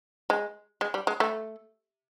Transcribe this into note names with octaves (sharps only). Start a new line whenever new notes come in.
G#3
G#3
G3
G#3
A3